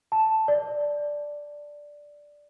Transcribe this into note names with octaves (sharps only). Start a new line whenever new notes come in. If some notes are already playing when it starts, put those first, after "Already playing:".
A5
D5